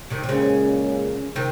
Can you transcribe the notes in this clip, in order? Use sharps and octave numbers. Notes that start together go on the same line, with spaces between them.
C3 D#3
C3
A#2 C#3 G#3 C#4
C3 D#3